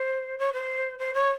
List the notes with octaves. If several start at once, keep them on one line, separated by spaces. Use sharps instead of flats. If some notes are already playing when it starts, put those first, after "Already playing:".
Already playing: C5
C#5
C5
C5
C#5